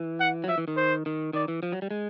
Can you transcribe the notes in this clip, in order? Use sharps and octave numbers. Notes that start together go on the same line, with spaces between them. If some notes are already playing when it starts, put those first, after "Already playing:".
Already playing: E3
F#5
F#3
F3 E5
E3
D#3
C5
D#3
D#3 D5
E3
F3
F#3
G3
G#3